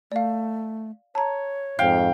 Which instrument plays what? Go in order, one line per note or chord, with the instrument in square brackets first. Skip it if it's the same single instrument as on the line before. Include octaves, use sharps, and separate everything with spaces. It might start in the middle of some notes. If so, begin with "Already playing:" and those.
[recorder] A3 [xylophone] D5 F5
[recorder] C#5 [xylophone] A5 A#5
[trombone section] F2 G#2 [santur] F5 G5